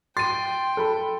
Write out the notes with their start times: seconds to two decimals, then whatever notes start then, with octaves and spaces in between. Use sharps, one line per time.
0.17 G5 C6 A6 D#7
0.77 A4 B5